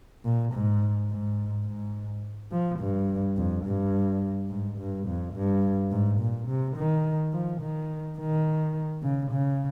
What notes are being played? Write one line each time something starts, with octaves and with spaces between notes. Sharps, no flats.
A#2
G#2
G#2
G#2
F3
G2
F2
G2
G#2
G2
F2
G2
G#2
A#2
C3
D#3
F3
D#3
D#3
C#3
C#3